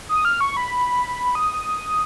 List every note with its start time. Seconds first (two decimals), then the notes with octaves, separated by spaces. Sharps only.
0.09 D#6
0.25 F6
0.41 C#6
0.57 B5
1.35 D#6